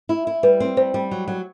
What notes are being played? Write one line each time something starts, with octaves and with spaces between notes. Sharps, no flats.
E4
E4
G3 B4
C4
G3 C5
G3
F#3
F#3